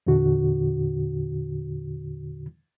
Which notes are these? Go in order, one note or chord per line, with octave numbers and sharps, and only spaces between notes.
E2 A#2 D3 F#4